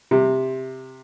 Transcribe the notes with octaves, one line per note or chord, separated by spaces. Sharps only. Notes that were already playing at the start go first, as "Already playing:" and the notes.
C3